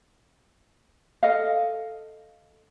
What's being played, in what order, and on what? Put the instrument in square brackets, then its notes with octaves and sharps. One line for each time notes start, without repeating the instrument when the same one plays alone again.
[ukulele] A4 D#5 F5